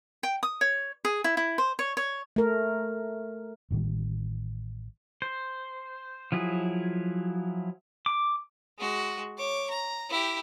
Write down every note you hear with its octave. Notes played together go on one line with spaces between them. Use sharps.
G5
D#6
C#5
G#4
E4
E4
C5
C#5
C#5
A3 A#4
A1 A2 D#3 G3
C5
F3 F#3 E4 G#4
D6
G#3 F#4
C#5 D6
A#5
E4 G4